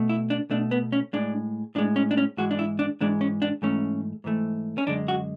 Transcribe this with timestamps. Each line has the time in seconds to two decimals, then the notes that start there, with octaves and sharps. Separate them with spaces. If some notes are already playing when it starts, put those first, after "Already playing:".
Already playing: B2 A3
0.09 E4
0.30 D4
0.51 B2 A3 D4
0.71 B3
0.92 C#4
1.13 A2 G#3 D4
1.75 A2 D4
1.78 G#3
1.96 C#4
2.11 D4
2.17 C#4
2.37 G#2 E3 G#3 F#4
2.51 D4
2.59 E4
2.79 D4
3.01 G#2 E3 G#3 D4
3.21 C#4
3.42 D4
3.62 G#2 E3 A3 C#4
4.24 G#2 E3 A3
4.78 C#4
4.87 F#2 D3 G#3 D4
5.08 F#4